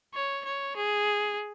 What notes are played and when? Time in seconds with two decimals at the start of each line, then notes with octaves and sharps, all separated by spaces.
0.14 C#5
0.45 C#5
0.76 G#4